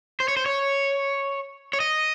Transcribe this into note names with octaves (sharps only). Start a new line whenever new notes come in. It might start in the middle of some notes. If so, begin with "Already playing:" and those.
C5
C#5
C5
C#5
C#5
D#5